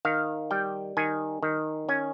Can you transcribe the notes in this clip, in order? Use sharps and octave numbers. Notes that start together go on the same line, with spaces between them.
D#3 F5
G3 G5
D#3 G#5
D#3
C#4 G#5